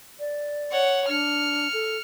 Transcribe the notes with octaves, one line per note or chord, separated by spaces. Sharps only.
D5
C#5 F#5
D4 F6 C#7
A4